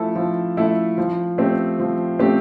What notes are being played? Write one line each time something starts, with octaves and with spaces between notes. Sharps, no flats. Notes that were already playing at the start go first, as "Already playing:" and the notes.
Already playing: F3 A3 E4 A4
F3
A3 E4 A4
F3
A3 C4 G4
F3
A3 C4 G4